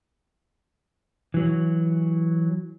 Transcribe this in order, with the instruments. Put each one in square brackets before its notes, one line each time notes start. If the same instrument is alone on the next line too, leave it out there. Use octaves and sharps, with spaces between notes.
[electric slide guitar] E3 F#3